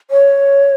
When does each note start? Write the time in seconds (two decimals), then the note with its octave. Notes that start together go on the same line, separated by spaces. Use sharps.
0.11 C#5